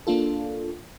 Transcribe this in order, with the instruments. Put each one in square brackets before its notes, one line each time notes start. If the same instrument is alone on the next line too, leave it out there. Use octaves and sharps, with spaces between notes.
[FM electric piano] A#3 D4 F4 A4